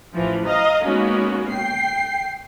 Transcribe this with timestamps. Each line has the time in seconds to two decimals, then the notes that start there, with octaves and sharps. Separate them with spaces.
0.13 A1 E3 F3
0.46 D#5 F5 A#5
0.84 G#3 A#3 B3 C#4 D#4 F#4
1.51 G5 C7